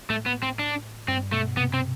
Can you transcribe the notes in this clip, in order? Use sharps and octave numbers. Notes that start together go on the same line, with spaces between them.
A2 A3
B3
C4
D4
G2 C4
B2 A3
C3 B3
C4